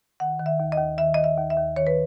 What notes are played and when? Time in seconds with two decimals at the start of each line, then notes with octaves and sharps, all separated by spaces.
0.20 D#3 F#5
0.40 D#3
0.46 E5
0.60 D#2
0.72 D#5
0.78 D#2
0.98 D#3 E5
1.14 D#3 D#5
1.24 E5
1.37 D#2
1.50 E5
1.57 D#2
1.76 D#3 C#5
1.87 B4